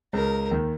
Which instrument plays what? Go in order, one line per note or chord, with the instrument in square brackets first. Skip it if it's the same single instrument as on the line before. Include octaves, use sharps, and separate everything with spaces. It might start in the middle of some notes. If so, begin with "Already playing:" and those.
[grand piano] C#2 C#3 [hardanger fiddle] A#4
[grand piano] D#2 D#3